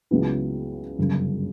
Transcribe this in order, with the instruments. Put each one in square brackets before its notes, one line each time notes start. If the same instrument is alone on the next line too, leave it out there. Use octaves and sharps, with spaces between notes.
[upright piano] C#2 C#3 F#3 B3 E4
G1 F#2 C#3